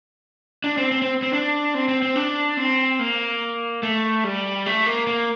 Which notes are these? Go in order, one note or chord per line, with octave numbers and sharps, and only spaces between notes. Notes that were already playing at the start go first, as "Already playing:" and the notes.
D4
C4
C4
C4
C4
D4
C4
C4
C4
D4
C4
A#3
A3
G3
A3
A#3
A#3